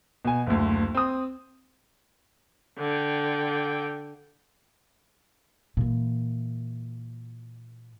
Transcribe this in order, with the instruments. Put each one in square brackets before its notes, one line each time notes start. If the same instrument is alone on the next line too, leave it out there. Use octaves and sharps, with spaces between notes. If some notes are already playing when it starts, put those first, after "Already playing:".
[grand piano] B2 G#5
F#1 D2
C4 D#6
[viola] D3 G5
[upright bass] A#2 E3